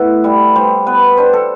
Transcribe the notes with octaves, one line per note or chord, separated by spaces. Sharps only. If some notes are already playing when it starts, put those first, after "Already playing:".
Already playing: A2 B3 E5 F#5
G3
G3 C5
B3 B4
D4 C5
A4